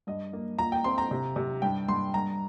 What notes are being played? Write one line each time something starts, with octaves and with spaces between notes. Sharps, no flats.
G2 D#5
A#3
A#2 A#5
G5
C4 C6
A#5
C3
C3
G2 G5
G2 C6
G2 A#5